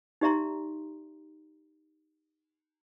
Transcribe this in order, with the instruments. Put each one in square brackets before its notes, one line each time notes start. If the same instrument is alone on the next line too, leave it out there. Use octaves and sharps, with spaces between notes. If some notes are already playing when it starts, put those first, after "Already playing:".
[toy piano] D#4 G4 D5 E5 A#5 C6